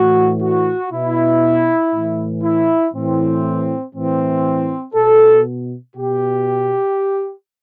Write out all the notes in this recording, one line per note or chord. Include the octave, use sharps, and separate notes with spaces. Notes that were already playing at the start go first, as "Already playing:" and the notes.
Already playing: A2 E3 F#4
F#4
B2 E4
A2 E3
E4
A2 E3 C4
A2 E3 C4
B2 A4
B2 G4